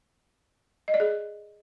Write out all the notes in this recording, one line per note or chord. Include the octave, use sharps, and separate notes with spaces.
D#5
D5
G#4